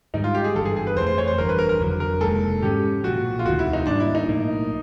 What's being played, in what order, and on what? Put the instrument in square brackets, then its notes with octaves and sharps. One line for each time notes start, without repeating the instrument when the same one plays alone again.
[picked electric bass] G#2 D#3 G3 [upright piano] D#4
[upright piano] F4
G4
G#4
[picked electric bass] G1 G2 E3 [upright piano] A4
[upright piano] G#4
G#4
B4
[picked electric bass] F2 C3 E3 A3 [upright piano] C5
[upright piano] C5
C#5
C5
[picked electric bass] G1 G2 E3 [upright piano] A#4
[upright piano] B4
A#4
A#4
[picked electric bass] F#1 F2 D3 F#3
[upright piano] A#4
[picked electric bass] F1 D#2 D#3 G#3 [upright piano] A4
[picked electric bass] G#2 D#3 G#3 C#4 [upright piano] G4
[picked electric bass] B1 A#2 F3 [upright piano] F#4
[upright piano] F4
[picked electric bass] E1 D2 C3 D#3 [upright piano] F#4
[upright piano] E4
D#4
[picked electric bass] G#2 D#3 G3 A#3 [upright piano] D4
[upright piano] E4
D#4
[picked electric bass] B1 A2 F3 A#3